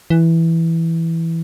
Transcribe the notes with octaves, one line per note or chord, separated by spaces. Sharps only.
E3